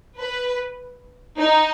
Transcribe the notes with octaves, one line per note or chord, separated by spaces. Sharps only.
B4
D#4